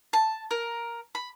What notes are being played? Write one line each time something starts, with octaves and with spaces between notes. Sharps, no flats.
A5
A#4
B5